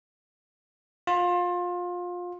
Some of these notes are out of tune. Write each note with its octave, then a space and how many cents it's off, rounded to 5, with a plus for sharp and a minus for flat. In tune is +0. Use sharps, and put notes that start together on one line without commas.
F4 +25